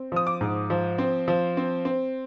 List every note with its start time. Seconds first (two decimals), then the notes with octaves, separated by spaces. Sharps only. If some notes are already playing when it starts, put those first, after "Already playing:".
Already playing: C4
0.12 F3 D#6
0.27 D6
0.41 G#2
0.70 F3
0.98 C4
1.28 F3
1.57 C4
1.85 C4